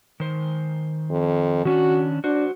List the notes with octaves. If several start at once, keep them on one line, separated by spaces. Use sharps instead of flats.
D#3 C5
F2
D#3 C#4 D4 F#4
D4 F#4 C5